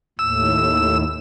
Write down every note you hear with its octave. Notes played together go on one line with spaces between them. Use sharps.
D#2 A2 E6